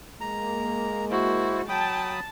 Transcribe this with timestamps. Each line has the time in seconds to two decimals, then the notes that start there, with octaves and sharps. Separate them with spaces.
0.21 G#3 A#3 A#5
1.11 E4 F#4 C5
1.69 F#3 G5 A5 B5 D#6